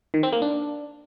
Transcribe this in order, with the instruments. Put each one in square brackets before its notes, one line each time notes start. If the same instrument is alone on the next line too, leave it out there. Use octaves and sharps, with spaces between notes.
[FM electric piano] D#3
C4
A#3
D4